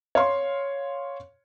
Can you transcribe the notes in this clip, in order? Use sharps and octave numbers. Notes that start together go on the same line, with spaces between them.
C#5 F5 C6